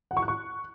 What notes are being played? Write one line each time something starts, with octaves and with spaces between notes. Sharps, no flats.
F#5
C#6
F#6
C#6